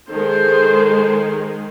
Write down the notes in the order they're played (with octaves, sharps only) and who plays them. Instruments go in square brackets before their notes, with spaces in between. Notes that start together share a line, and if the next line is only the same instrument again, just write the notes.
[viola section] D#3 G#3 [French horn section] G#4 [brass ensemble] A4 [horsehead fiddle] C5